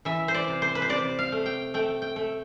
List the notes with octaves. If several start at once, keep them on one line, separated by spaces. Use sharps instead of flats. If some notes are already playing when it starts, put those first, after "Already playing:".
E3 E5
C5
D5
C3
C5
B4
C5
C3 D5
F5
A3
G5
A3 G5
G5
A3